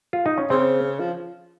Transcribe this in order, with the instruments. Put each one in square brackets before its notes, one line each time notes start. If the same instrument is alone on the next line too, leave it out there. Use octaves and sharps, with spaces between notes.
[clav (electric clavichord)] F4
D#4
C#4
[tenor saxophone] C#3 [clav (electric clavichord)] C4
[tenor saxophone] F3